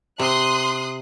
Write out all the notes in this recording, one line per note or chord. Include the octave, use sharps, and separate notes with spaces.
C3 C6 D#6 F#6